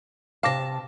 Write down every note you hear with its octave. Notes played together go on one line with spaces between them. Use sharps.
C3 F5 A5 D6 A#6